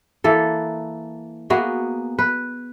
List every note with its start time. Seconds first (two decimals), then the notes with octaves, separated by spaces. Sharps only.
0.24 E3 A#3 A4
1.50 A#3 B3 F#4 G#4
2.19 B4